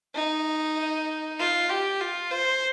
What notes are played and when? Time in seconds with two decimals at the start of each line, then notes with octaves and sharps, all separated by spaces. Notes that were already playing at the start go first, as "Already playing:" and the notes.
0.14 D#4
1.39 F4
1.69 G4
2.01 F4
2.31 C5